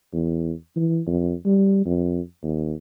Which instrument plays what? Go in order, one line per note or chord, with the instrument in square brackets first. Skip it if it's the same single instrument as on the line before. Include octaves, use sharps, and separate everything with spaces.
[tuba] E2
E3
F2
G3
F2
D#2